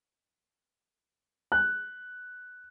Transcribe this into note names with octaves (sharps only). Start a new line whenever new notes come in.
F#6